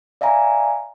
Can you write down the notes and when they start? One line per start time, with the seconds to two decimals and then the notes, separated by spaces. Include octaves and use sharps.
0.21 D5 E5 F5 G#5 A#5